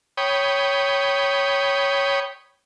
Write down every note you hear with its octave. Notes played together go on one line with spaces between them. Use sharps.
C#5 G5 B5 D#6